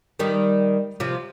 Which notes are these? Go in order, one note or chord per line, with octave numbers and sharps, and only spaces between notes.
D#3 G3
C3 F3